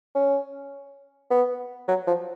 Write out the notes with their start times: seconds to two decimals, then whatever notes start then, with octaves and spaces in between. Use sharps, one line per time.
0.15 C#4
1.31 B3
1.88 F#3
2.07 F3